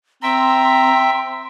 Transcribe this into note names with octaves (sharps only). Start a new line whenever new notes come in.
C4 E5 G5 A#5 C6 E6